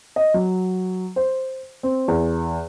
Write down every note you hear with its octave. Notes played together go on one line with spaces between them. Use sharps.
D#5
F#3
C5
C4
E2